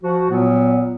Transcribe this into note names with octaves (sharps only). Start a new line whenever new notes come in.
F3 F#4
A#2 F#3 B3